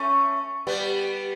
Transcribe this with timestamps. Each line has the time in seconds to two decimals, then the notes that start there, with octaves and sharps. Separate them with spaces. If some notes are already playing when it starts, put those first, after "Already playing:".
Already playing: A3 C#4
0.67 G3 B3